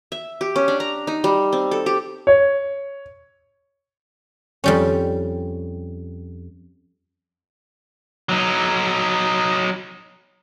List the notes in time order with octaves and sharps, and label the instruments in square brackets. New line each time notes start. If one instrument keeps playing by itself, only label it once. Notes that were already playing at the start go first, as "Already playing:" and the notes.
[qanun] E5
G4
C#4
D4
A#5
D#4
G3
C4
A4
G4
[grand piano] C#5
[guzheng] F2 G3 C#4
[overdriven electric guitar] F#3 D#4